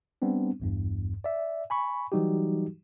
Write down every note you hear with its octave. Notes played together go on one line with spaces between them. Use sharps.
G3 B3 C4 D4
A1 E2 G2
D5 E5
G#5 B5 C#6
E3 F#3 G3 D#4 F#4 G4